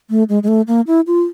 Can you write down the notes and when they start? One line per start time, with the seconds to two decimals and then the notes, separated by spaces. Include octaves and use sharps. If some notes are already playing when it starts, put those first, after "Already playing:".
0.10 A3
0.29 G#3
0.43 G#3
0.48 A3
0.67 A#3
0.87 E4
1.07 F4